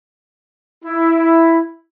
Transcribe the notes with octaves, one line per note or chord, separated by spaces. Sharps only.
E4